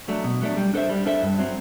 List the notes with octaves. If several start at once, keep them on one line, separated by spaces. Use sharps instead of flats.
F#3 A3 D4
B2
F#3 A3 D4
G3
D4 A4 C5 E5
G3
D4 A4 C5 E5
G2
F#3 C4